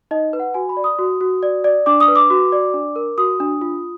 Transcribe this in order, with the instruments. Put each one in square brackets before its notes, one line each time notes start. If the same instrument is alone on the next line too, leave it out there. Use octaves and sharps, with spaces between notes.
[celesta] D#4 D#5
B4
F#5
F#4 G#5
B5
D5
D#6
F#4
F#4
D5
D5
D4 D6
D#6
B4
D6
F#4
D5
D4
A#4
F#4 D#6
D4
F4